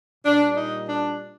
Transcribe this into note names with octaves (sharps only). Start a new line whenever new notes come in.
A#2 G3 D4
D#4
D4